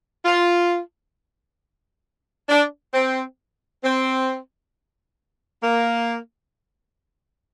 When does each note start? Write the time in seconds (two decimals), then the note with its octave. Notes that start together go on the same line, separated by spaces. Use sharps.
0.24 F4
2.49 D4
2.93 C4
3.83 C4
5.62 A#3